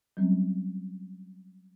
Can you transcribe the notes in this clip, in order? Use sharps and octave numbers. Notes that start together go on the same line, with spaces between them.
F#3 G3 C4 C#4